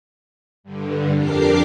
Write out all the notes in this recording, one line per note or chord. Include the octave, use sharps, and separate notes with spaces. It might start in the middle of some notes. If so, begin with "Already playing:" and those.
G2 D3
F2 D4 G4 A#4 D6 C7